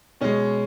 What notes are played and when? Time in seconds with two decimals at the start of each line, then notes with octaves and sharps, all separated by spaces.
0.21 B2 G#3 C#4